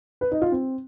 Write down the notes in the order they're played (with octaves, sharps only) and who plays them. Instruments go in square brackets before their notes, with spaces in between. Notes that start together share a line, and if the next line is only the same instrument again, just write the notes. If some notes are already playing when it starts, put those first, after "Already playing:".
[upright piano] B4
D#4
F4
C4